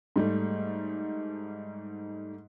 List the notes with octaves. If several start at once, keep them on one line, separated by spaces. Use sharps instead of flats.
G#2 G3 A3